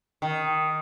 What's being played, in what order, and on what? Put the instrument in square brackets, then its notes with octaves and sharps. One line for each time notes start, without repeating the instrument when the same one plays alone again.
[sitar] D#3